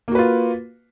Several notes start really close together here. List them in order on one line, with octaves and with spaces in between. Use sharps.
A#3 F#4 B4 F4